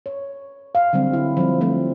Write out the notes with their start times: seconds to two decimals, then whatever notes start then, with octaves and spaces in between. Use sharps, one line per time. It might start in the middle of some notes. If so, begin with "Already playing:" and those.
0.06 C#5
0.75 F5
0.93 D3 F#3 G3 C4
1.13 E4
1.37 F3 G3 C4
1.61 F3 A3 C4